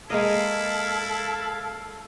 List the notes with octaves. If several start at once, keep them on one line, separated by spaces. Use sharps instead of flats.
G#3 A#3 E4 A4 D#5 F5